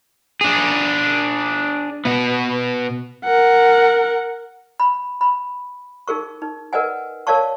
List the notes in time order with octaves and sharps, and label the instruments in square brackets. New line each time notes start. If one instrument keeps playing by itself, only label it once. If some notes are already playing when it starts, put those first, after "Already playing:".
[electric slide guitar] D4 G#4
B2 B3
[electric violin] A#4 F#5
[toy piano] B5
B5
D#4 G#4 A#4 C#6
D#4
A#4 B4 D5 D#5 F#5 G#5
A#4 C#5 D5 F5 A5 C#6